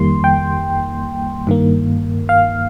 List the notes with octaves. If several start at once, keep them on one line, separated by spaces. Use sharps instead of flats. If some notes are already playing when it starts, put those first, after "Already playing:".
Already playing: F2 D#3 G3 A#3 C6
G5
G2 D#3 A#3
F5